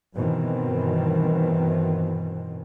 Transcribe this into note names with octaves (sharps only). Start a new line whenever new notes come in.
G2 B2 D#3 E3 C4